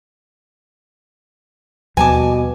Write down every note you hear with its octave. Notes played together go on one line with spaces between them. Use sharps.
D#2 B2 F3 G3 G#5 A5 D6